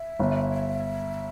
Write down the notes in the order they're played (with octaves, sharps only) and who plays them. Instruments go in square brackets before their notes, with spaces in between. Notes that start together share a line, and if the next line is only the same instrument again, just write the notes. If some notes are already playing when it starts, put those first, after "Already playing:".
Already playing: [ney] E5
[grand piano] G1